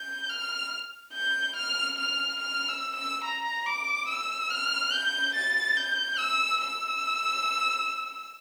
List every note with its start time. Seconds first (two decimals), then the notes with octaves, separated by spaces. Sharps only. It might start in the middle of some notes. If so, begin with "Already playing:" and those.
Already playing: G6
0.29 F6
1.14 G6
1.55 F6
1.98 F6
2.40 F6
2.68 E6
2.96 E6
3.24 A#5
3.66 D6
4.08 E6
4.50 F6
4.92 G6
5.34 A6
5.77 G6
6.19 E6
6.61 E6